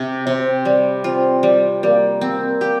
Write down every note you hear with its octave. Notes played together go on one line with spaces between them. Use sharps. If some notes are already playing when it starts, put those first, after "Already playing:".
Already playing: C3
C3 C4
G3
C4 F4
G3
G3 A#3
C4
G4